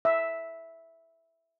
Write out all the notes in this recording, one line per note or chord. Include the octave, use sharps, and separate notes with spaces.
E5